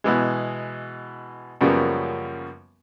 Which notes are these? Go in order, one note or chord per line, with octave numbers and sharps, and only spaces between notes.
B2 E3 G#3
F#2 C#3 F3 G3 A#3 B3